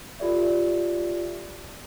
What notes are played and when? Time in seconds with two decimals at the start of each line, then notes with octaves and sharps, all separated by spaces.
0.19 F4 G4 A4 D5 E5